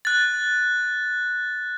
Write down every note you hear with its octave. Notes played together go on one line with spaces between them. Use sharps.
F#6 A6